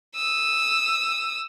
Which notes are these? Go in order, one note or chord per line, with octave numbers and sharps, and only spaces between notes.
D#6 E6